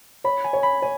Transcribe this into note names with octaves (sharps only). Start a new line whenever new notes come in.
C#5 B5
G#5
C#5
B5
C#5 G#5